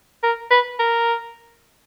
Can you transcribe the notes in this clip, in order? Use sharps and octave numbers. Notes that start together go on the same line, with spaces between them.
A#4
B4
A#4